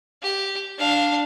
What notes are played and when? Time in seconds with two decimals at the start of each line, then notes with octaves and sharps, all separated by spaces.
0.22 G4
0.78 D4 F5